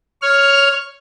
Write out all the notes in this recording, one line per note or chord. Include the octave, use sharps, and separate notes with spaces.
C#5 F6